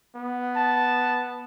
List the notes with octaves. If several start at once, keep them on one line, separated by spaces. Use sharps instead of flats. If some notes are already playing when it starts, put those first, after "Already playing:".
B3
A5